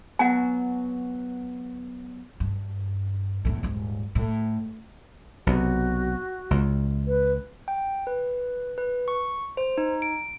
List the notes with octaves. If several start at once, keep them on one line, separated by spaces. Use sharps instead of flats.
F#3 B3 F#4 F#5 G#5
G2
E2 A2
D#1 G#2
A2
B1 C3 F#4
C#2
B4
G5
B4
B4
C#6
C5
D#4
D7